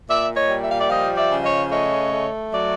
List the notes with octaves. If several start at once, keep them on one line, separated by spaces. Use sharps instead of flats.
A#2 D5 E5
C#5 D#5
G3
E5
F5
D5 E5
F3 D#5 F5
D5 E5
C#3
C#5 D#5
A3 C#5 D#5
A3
F#3 D5 E5